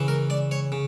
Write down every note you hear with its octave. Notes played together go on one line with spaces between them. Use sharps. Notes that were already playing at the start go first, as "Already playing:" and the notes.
Already playing: C#3 E3
A#4
D5
C#5
C#3